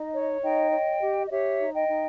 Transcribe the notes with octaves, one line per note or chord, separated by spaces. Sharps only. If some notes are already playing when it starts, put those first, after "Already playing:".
Already playing: D#4 D#5
C#5
D#4 D#5 G5
C#5
G4
D#5
G4 C#5 E5
D#4
D#5 G5
D#4